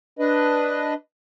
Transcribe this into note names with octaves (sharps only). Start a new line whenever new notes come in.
D4 B4 D#5